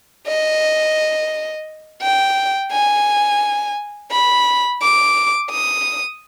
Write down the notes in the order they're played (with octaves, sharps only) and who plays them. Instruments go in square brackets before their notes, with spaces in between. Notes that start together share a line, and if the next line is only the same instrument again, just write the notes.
[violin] D#5
G5
G#5
B5
D6
D#6